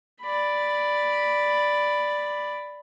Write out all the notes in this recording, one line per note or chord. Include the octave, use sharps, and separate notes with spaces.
D5 B5